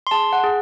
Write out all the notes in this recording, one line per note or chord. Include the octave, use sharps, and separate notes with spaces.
C6
G#4 A5
F#5
G#4